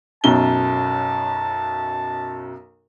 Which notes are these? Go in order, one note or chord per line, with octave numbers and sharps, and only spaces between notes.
B1 F#2 A5 G7